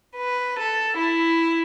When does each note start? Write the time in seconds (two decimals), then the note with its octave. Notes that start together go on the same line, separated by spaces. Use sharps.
0.16 B4
0.58 A4
0.99 E4